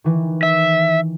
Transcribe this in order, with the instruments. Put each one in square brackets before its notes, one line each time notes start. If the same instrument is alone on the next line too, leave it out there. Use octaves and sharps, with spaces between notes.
[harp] D#3 E3
[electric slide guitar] E5